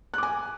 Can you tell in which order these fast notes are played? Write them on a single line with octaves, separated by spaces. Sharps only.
F#6 D6 G#5